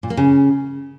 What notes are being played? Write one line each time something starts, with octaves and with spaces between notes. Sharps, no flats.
A#2
A#3
C#3